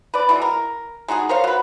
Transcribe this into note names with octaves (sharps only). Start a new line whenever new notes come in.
B4 D5
E3 F#3 G#3
A#4
G#3 D#4 F#4 G#4
A#4 C5 C#5 F5
F#3 B4